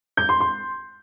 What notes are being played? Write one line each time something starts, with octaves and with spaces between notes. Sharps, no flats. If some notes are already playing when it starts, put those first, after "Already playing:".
G6
C6
C6